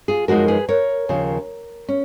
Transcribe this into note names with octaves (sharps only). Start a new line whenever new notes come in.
F4 G#4
F#2 F3 G#3 D#4 F#4 A#4
G#4 B4
A#4 C#5
D#2 C#3 F3
C#4